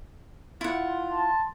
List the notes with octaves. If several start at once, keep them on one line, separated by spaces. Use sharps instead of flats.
E4 F4 F#5 C6
A5